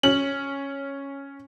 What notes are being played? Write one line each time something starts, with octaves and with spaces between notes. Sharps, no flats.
C#4 F#7